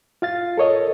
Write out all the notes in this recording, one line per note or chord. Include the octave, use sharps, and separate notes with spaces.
F4 F5 A6
A4 A#4 C#5 D#5